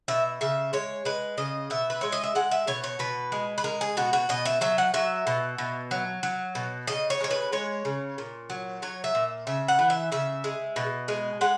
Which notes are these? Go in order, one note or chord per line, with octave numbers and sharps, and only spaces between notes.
B2 E5
C#3 E5
G#3 C#5
G#3 B4
C#3 D#5
B2 E5
B4
G#3 C#5
D#5
E5
G#3 F#5
E5
B2 C#5
C#5
B2 B4
G#3
B4
G#3 A#4
G#4
B2 F#4
F#4
B2 D#5
E5
F#3 E5
F#5
F#3 E5
B2
B2
F#3
F#3
B2
C#3 D#5
C#5
G#3 C#5
B4
G#3 C#5
C#3
A#2
F#3
F#3 C#5
E5
A#2
C#3 E5
F#5
E3
E5
C#3 E5
G#3
B2
G#3
G#3 F#5